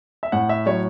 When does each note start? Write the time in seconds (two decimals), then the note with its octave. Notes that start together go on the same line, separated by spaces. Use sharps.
0.23 E5
0.32 A2 F#5
0.49 E5
0.66 F#3 C#5